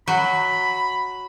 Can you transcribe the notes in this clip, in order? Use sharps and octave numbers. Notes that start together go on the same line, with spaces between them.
F#3 B5